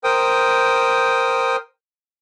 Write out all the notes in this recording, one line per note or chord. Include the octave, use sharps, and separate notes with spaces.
A#4 C5 G5 D#6